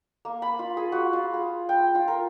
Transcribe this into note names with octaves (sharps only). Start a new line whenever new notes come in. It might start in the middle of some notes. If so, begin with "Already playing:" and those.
A#3
B5
F4
G#4
F#4
F4
G#4
G5
F4
A#4